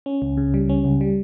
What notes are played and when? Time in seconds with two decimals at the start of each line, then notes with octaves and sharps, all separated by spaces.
0.06 C#4
0.22 C#2
0.37 C#3
0.54 G3
0.69 C#4
0.85 C#2
1.01 G3